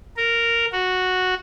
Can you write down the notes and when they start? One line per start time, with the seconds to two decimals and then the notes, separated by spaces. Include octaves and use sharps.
0.17 A#4
0.72 F#4